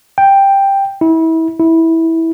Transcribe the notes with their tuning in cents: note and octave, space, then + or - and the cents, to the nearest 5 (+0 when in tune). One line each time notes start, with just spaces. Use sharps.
G5 +5
E4 -30
E4 -15